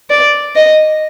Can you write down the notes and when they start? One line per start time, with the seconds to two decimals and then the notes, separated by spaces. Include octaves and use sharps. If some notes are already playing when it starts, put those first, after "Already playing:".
0.10 D5
0.55 D#5